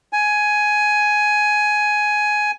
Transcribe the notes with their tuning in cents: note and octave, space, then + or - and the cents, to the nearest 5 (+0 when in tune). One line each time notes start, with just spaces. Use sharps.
G#5 +10